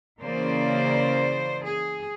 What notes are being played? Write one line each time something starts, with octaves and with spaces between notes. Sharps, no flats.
C#3 E3 A#3 C5 D5
G#4